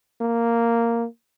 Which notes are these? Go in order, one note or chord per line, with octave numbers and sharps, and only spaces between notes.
A#3